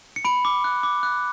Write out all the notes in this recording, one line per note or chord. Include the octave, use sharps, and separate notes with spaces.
C#7
B5 D7
D6
F#6
D6
F#6